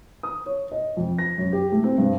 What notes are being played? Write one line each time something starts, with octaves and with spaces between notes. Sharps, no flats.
D#6
C#5
D#5
F2
A#6
F#2
G4
A3
C4
G2